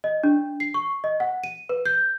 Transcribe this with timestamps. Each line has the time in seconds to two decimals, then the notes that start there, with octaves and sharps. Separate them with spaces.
0.04 D#5
0.23 D4
0.60 C7
0.74 C#6
1.04 D#5
1.20 F#5
1.44 D#7
1.69 B4
1.86 G6